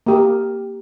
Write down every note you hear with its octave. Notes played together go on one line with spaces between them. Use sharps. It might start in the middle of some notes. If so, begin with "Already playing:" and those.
A#3 G4 A#4